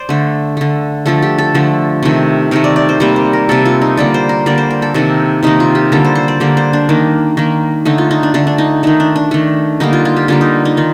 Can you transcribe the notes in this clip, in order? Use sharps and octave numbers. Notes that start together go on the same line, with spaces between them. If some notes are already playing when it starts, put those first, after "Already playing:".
Already playing: C5 D5
D3 A3
D3 A3
D3 F3 A3 A4
G4
A4
D3 F3 A3
C3 D#3 A3
C3 D#3 A3 A#4
D5
D5
C5
C3 G3 A#3 C5
C5
A#4
C3 G3 A#3 A4
F4
D#4
D3 G3 A#3 D5
C5
A#4
D3 G3 A#3 D5
C5
A#4
A4
C3 D#3 A#3 A4
C3 D#3 A#3 D#4
F4
G4
D3 G3 A#3 A4
C5
C5
D5
D3 G3 A#3 D5
C5
D4
D#3 A#3
D#3 A#3
D3 A3 D#4
F4
D#4
D4
D3 A3 D4
D4
D#4
D#3 A3 D#4
D4
D4
D#3 A3
D3 G3 A#3 D#4
F4
F4
G4
D3 G3 A#3 F4
D#4
D#4
D#3 F4